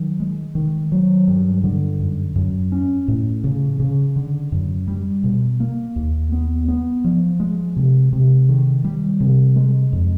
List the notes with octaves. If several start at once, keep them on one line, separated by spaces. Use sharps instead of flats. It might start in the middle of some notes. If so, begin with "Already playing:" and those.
Already playing: D#3 F#3
G#3
D#3
F#3
G2
D3
F#2
F#2
C#4
A2
C#3
C#3
D3
F#2
G3
B2
A#3
D#2
B3
B3
F3
G#3
C3
C3
D#3
G3
C3
G#3
F2